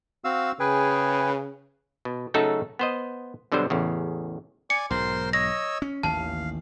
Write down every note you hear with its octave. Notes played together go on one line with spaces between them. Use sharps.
C4 F#4 F5 E6
C#3 G#4 B4 G5 G#5
B2
C#3 F#3 A3 D#4 F#4 A4
B3 C5 D#5
B2 D3 F#3 G3 C5
A1 E2 C#3
D5 G#5 C#7
B1 G#2 A#4 C5 C6
C#5 D#5 E6 A#6
C#4
A1 D#2 D#3 F5 A5